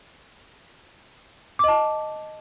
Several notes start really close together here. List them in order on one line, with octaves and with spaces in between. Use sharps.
D6 D#5 A5